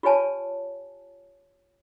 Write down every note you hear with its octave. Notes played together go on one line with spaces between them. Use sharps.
F4 G4 B4 C#5 G#5 A5